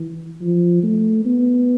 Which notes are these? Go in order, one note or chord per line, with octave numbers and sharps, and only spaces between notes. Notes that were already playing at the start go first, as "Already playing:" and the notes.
Already playing: E3
F3
A3
B3